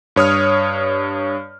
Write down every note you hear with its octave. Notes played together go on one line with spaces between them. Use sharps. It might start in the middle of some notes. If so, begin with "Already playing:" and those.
G2 C#5 D#6 F6